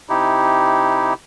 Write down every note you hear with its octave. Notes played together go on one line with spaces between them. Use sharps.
C3 D#4 E4 G4